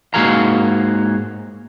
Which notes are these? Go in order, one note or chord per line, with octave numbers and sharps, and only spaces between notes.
G#2 A#3 F#4 G#4 F5 A#5